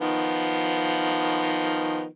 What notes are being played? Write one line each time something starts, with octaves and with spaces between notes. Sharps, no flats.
D#3 F3 B3